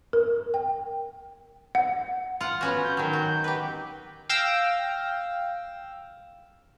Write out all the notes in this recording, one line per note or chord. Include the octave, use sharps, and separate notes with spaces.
A#4
G5
F#5
F4 F#5 F6
B3 C#4 F#4
G6
D#3 F#3 G6
F#4
G4 B4
F5 G5 E6 A#6